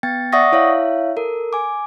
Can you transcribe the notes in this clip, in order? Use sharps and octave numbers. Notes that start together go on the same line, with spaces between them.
B3 G5 A6
D5 E5 F#5 C#6 D#6 A#6
E4 C#5 E5 F5
A4 A#4
G#5 D6